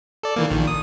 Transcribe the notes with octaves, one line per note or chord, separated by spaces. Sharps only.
A4 D5
D#3 E3 A#3
A#1 D#3
D#6